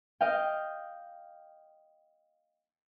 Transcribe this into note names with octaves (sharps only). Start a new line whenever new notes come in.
D#5 F5 G5